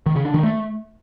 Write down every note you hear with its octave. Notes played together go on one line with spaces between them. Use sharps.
D#3
C#3
D4
D#3
A3